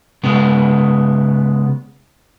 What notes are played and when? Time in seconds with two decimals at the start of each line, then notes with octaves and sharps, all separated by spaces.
0.24 C#3 G#3 B3